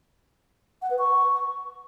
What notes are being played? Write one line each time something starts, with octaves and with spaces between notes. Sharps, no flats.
F#5
B4
C#6